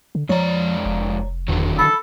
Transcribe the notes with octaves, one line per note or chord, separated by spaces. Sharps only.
D3
F2 F3 G#3 C#5 D5 A#5
F1
E2 D3 D#3 F#3
A4 B5